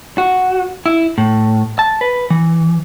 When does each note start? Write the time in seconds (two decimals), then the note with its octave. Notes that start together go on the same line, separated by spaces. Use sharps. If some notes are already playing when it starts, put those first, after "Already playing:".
0.18 F#4
0.86 E4
1.18 A2
1.79 A5
2.01 B4
2.30 E3